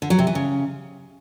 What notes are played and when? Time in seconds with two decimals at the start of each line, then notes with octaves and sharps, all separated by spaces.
0.02 D3
0.10 F#3
0.19 C3
0.27 E3
0.35 C#3